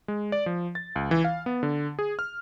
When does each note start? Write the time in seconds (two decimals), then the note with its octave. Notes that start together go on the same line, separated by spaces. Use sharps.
0.08 G#3
0.32 D5
0.46 F3
0.75 A6
0.96 C#2
1.11 E3
1.24 F5
1.46 B3
1.63 D3
1.99 G#4
2.19 F6